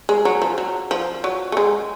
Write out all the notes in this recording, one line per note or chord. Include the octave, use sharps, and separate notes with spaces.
G#3
F#3
F3
F#3
F3
F#3
A3
G#3